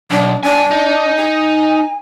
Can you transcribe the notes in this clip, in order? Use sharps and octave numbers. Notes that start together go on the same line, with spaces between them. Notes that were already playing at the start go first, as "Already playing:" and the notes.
B1 D4
G2 D4 G#5
D#4
G#5